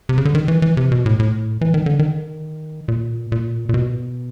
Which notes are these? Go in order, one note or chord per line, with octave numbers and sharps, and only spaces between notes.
C3
C#3
D3
D#3
E3
E3
C3
B2
A2
A2
E3
D#3
D3
D#3
A#2
A#2
A#2
B2